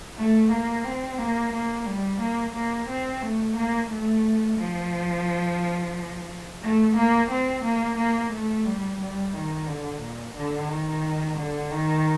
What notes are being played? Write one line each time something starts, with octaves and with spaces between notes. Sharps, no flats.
A3
A#3
C4
A#3
A#3
G3
A#3
A#3
C4
A3
A#3
A3
F3
A3
A#3
C4
A#3
A#3
A3
G3
G3
D#3
D3
A#2
D3
D#3
D3
D#3